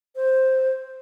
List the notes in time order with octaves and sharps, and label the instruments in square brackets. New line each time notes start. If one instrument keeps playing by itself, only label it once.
[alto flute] C5